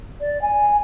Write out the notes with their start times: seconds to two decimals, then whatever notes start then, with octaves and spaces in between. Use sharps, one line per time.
0.21 D5
0.42 G#5